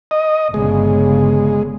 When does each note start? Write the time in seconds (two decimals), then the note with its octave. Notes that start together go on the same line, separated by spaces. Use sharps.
0.11 D#5
0.54 G1 C#3 G#3